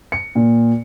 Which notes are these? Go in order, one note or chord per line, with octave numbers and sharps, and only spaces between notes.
C#7
A#2